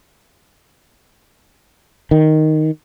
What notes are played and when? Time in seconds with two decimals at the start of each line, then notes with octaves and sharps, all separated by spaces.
2.11 D#3